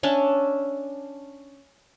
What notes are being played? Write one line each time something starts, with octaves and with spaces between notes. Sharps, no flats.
C#4 D4 E5